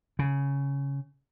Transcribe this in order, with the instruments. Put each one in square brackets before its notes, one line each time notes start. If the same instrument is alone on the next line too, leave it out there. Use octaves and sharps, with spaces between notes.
[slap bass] C#3